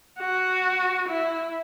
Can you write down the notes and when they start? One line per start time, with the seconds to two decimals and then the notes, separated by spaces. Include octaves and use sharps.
0.19 F#4
1.09 E4